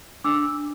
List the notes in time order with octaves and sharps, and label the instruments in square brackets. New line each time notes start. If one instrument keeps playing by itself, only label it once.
[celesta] D4 D6 E6